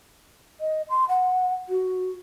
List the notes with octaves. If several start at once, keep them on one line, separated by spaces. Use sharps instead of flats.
D#5
C6
F#5
F#4